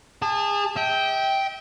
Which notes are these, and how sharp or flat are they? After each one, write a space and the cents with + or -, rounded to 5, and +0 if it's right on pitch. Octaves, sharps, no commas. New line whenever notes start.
G#4 -30 A5 +0
E5 -40 G5 -5